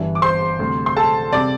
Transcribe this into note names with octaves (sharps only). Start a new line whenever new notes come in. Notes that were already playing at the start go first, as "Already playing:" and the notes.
Already playing: G1 G2 E3 G3 E4
D6
C5 C6
D2 C3 G3
C6
A4 A5
C3 G3 C4 D5 D6